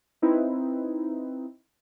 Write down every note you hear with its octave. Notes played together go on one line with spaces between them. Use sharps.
C4 D#4 E4 B4